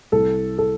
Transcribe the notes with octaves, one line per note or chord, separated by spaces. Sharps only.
C2 A4
A4